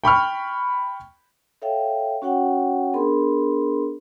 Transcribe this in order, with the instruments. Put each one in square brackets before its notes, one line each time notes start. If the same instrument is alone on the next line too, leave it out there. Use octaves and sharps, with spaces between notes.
[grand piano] G5 B5 C#6 F6
[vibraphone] A4 C#5 E5 F5 G5
C#4 F#4 C#5 F#5 G5
B3 D4 G#4 A#4 B5 C6